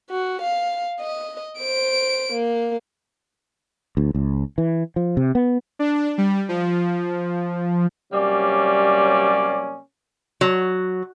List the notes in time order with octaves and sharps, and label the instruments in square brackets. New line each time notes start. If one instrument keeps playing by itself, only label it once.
[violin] F#4
F5
D#5
C5 D7
A#3
[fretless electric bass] D2
C#2
E3
F3
C3
B3
[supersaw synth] D4
G3
F3
[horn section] C3 F#3 G3 A#3 C#4 D5
[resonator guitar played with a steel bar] F#3